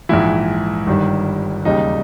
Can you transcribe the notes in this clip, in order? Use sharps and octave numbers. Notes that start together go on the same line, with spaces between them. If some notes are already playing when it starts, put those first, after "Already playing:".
A#1 G#2 E3 E4
G1 G2 D#3 G3
E1 D#2 C#3 G3 D#4